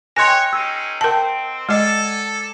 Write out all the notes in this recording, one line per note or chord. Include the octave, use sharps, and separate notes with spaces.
A#4 C#5 D#5 G5 G#5 C6 F#6 A#6
G#3 C#4 D#4 E6
C4 A#4 F#5 G5 A5
G#3 A4 D5 D#5 G#5 A5